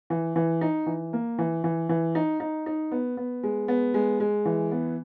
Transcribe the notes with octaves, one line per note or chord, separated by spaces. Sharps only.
E3
E3
D#4
E3
A#3
E3
E3
E3
D#4
D#4
D#4
B3
B3
G#3
B3
G#3
G#3
E3
B3